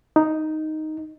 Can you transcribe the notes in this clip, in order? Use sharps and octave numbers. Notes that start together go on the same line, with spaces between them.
D#4